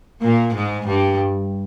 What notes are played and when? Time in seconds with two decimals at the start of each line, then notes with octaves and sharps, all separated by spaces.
0.22 A#2 A#3
0.54 G#2 G#3
0.87 G2 G3